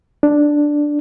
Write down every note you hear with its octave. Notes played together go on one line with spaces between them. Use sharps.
D4